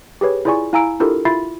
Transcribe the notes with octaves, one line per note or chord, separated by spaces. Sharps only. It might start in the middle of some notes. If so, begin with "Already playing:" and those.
G4 G#4 B4 C#5
E4 F4 G#4 D5 G#5 C#6
E4 F5 G#5 A#5 E6 D7
D4 E4 F4 G4 A4 A#4
E4 F4 E5 B5 A6 C7